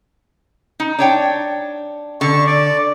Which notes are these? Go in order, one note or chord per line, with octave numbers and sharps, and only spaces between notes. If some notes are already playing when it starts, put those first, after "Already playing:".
D#4
D4 C#5 G5
D3 C#6
D5